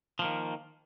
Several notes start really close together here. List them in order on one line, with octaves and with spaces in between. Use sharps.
F3 A#3 D#3